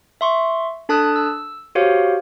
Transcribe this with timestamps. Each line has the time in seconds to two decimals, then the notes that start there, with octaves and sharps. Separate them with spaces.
0.21 E5 C6 C#6
0.89 D4 A4 A5 D#6 F#6
1.16 E6
1.75 F#4 G4 C5 C#5 F5